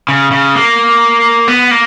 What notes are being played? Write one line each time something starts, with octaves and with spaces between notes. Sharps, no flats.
C#3
C#3
A#3
B3
A#3